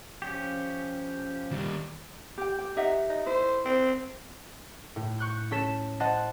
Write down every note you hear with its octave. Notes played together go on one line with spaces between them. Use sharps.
F3 C#4 G4
D#2 G3
G4 G5
G4 G5
D#4 G4 E5 F#5
D#4
E4 C5
C4
A2
C#6 F#6 G6
C#4 A4 B6 E7
C5 D#5 F#5 A5